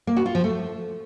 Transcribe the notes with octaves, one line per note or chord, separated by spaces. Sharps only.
A#3
F#4
F4
F3
A3